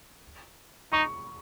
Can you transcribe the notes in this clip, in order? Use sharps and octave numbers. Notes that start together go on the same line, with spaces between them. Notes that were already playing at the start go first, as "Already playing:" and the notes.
D#4 C#6